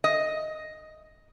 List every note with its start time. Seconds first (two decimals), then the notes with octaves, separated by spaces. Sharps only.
0.04 D#5